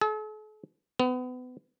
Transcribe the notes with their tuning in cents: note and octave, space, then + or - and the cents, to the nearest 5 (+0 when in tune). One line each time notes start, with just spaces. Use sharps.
A4 -45
B3 +30